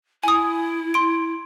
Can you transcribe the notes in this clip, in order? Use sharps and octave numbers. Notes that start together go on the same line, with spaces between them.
E4 G#5 D#6
C6 D7